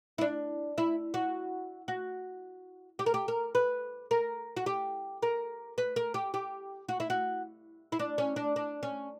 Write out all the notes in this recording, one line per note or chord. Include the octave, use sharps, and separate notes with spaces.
E4
D4
E4
F#4
F#4
G4
A#4
G4
A#4
B4
A#4
F#4
G4
A#4
B4
A#4
G4
G4
F#4
E4
F#4
E4
D4
C#4
D4
D4
C#4